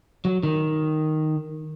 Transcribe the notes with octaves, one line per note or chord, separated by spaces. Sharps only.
F#3
D#3